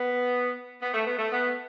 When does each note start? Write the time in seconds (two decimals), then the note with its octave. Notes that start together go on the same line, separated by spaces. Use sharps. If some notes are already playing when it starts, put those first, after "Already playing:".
Already playing: B3
0.82 B3
0.94 A3
1.07 B3
1.18 A3
1.32 B3